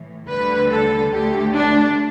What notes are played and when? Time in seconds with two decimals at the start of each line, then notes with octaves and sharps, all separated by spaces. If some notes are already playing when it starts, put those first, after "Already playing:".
Already playing: A2 E3
0.28 D2 D3 G3 B4
0.71 A4
1.12 D2 D3 A3 G4
1.54 D4